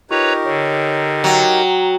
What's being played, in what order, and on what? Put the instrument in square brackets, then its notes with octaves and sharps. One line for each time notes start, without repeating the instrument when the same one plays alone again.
[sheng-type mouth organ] D#4 G4 A#4 [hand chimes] F4 C#6 [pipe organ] B4 C#5 A#5
[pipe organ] D3 [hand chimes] C#5
[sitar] F#3 [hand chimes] G5 A#5 D#6